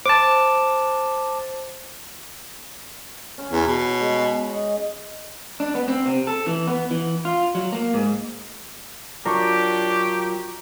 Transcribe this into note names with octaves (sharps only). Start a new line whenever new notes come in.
C5 A5 D6
C#4 C#5
E2
B2
G#3
D#5
D4
B3
C4
C3
A4
E3
B3
E3
F4
F#3
A#3
G#2
F#3 D4 F4 G4 A#4 A#5 C#6